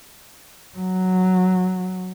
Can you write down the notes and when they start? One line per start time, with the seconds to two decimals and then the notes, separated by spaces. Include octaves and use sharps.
0.78 F#3